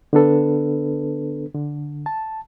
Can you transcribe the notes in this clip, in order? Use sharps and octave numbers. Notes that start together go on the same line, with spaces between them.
D3 B3 D4 A4 B4
D3
A5